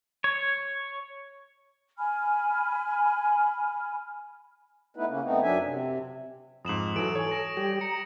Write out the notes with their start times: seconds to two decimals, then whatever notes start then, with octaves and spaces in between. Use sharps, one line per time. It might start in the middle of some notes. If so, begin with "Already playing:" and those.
0.24 C#5
1.97 G#5 B5 F6
4.96 A3 B3 D#4 E4 B4
5.09 C#3 A#3 C#4
5.23 A3 B3 C4 D#4
5.42 F#2 F#3 D4 E5 G#5
5.65 C3
6.65 F2 G#2 D#6 E7 F#7
6.96 E3 F#3 A4 D7
7.15 C#5 G#5
7.31 A#6 D7
7.57 G3 G4
7.81 A#5 C#7